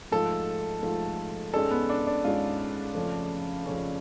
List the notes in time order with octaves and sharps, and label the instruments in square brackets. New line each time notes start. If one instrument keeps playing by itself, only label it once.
[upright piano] G#2 F3 A3 F4 [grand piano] A4
[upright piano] G#2 F3 A3 F4
[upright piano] G#2 G#3 C#4 G#4 D5 [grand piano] A4
[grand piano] B3
D4
D4
[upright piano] G#2 G#3 C#4 G#4 D5 [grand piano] F4
[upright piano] F2 C#3 F3 A3 C#4
F2 C#3 F3 A3 C#4